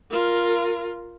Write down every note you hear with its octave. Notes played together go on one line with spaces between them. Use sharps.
F4 A#4